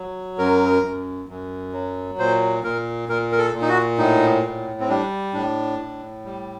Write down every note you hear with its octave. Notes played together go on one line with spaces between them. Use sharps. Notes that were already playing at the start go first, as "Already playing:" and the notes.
Already playing: F#3
F#2 A#4
F#2
F#2
F#3
A#2 C5
A#2 A#4
A#2 A#4
A#4
A4
A#2
D#4
F#4
A2 D#4
A2
C4
G3 D4
A2 D4
A2
G3